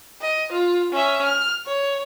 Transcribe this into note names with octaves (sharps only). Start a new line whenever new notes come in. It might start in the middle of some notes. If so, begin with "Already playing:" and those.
D#5
F4
C#4 E5
F6
C#5